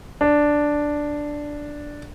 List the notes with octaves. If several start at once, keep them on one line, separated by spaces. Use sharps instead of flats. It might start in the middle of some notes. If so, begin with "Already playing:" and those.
D4